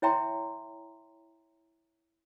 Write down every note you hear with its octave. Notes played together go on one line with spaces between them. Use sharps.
E4 C#5 E5 G5 A#5 C6